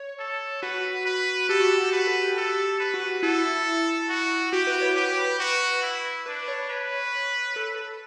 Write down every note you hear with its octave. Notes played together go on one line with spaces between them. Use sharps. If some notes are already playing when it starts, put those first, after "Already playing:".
Already playing: C#5
A4
F#4 B4
B4
G4 A4
F#4
G4
F#4
F#4 B4
A4
G4
A4
B4
F#4
F#4
E4 A4
F#4
F#4 G4
B4
C#5
G4 B4
F#4
E4
D4 B4
C#5
B4 C#5
A4